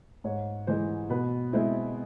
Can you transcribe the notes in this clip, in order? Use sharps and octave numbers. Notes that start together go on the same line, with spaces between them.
G#2 C#5
E3 G#3 C5
B2 B4
G#3 C4 E4